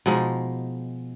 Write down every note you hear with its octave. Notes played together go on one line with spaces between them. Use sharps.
B2 F3 G#3 D#4